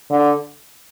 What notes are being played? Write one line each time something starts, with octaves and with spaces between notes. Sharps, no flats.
D3